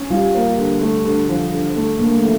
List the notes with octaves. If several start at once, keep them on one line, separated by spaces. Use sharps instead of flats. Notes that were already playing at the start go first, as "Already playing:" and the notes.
Already playing: C#4
G3 F4
A#3
D3
A3
D3
F3
D3
A3
D3 A#3
A3
F3